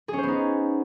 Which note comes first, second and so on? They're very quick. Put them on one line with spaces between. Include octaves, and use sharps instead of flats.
G#4 C#4 C5 B3 D#4